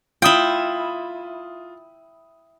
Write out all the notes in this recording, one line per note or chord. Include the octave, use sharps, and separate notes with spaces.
E4 F4 G5 D#6